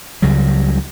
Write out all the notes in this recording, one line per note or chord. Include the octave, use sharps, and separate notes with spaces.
C#2 C#3 F#3 G3